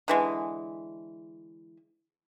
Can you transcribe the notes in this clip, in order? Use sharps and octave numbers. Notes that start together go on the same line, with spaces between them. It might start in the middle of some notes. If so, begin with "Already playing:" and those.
D3 E3 G#3